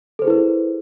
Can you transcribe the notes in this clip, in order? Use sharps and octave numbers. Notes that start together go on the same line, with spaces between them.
E4 G#4 A4 B4 C5